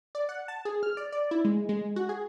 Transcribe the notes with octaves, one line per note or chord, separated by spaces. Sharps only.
D5
F#5
A5
G#4
F6
D5
D5
E4
G#3
G#3
F#4
G#4